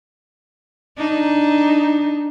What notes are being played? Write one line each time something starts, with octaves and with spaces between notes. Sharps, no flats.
D4 D#4